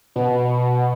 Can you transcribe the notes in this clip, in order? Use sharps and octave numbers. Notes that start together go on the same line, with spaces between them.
B2